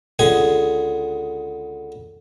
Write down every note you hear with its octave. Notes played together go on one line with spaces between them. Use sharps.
C#2 D3 G#4 G#5